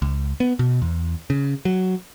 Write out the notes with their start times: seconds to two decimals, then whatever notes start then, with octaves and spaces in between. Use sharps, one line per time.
0.02 C#2
0.40 B3
0.59 B2
0.82 E2
1.30 C#3
1.65 F#3